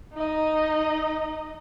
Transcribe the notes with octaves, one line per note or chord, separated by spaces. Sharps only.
D#4 D#5